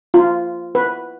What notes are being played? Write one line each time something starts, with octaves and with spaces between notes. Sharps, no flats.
F4
B4